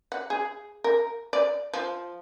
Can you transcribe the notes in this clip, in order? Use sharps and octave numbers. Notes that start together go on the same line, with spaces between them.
F#5
G#4
A#4
D5
F3